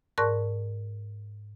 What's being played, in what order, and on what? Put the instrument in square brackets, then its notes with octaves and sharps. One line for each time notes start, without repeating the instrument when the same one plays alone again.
[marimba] G#2 A#4 D5 A5 C#6 F#6